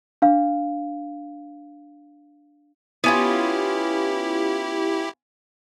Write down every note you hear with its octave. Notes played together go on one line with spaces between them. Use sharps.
D4 F5
B3 C#4 E4 F4 G4